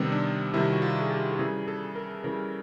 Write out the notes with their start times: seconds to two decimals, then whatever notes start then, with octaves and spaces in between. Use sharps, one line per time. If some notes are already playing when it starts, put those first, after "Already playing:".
Already playing: C3 D#3 G3 B3 C4
0.12 D4
0.54 C3 D#3 G3 E4
0.72 F#4
0.82 F4
1.01 G#4
1.10 G4
1.30 A4
1.39 C#3 E3 G3 G#4
1.68 A4
1.95 A#4
2.24 C#3 E3 G3 A#4